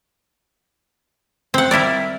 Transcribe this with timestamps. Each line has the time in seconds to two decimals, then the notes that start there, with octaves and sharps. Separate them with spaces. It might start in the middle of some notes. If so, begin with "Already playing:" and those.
1.54 C4 F#5
1.71 G3 E4 A#4 D5